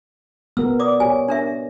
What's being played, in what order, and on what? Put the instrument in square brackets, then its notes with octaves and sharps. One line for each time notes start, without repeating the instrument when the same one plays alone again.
[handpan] B3 A#4 [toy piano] E6
[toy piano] D5 D6 D#6
[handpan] G4 C#5 [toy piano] G#5
[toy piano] D4 A#4 E5